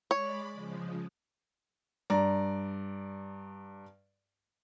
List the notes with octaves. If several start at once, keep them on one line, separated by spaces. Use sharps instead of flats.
G#3 C#5 D5 B5
C#3 F3 G#3
G2 D5 A#5